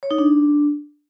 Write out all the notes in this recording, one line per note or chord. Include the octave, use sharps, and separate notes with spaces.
C#5
D#4
D4